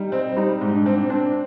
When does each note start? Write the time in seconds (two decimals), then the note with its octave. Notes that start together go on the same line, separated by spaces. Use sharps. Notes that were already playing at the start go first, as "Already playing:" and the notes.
Already playing: G3 D#4
0.12 C4
0.37 G3 D#4
0.61 G#2
0.74 D4
0.86 C4
1.10 C4 D4